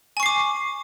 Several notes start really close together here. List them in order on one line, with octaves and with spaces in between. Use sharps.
G#5 C#6 C7 D6